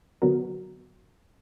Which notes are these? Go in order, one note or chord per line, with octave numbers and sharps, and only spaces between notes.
D3 F#3 B3 F#4 A#4